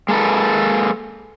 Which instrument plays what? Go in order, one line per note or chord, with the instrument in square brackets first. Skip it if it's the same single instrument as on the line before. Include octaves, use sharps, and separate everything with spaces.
[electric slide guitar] G#3 A#3 A4 B4